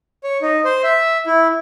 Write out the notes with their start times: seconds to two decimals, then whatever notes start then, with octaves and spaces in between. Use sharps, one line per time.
0.24 C#5
0.42 D#4
0.65 C5
0.83 E5
1.26 E4